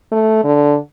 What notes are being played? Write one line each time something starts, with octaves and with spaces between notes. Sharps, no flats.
A3
D3